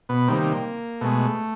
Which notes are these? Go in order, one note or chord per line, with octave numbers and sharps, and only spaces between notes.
B2 B3
C3 D#3 G3 A#3
B2 G#3 A3